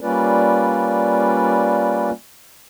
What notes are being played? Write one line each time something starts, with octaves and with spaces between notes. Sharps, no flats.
G3 A#3 C#4 F4 B4 D5